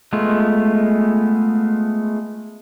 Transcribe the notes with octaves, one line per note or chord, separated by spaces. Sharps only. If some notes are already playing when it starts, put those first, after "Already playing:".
G#3 A3 B3 F4